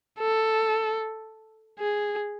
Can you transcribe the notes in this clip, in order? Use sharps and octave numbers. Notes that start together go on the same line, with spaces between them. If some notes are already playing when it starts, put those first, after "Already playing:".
A4
G#4